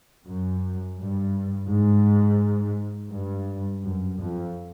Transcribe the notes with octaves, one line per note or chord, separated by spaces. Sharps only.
F#2
G2
G#2
G2
F#2
F2